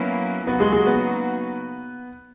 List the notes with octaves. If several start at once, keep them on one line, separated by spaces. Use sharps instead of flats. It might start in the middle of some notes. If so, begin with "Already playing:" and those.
Already playing: F#3 A#3 B3 C#4 E4 B4
C#3 F#3 A#3 B3 D#4 F#4 B4
G#3 G#4
G#3 G#4
B3 B4